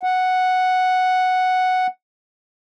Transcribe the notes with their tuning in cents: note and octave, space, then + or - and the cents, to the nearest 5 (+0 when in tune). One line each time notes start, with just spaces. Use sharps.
F#5 +0